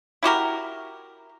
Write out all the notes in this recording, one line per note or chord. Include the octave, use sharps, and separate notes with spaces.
E4 F#4 G4 A#4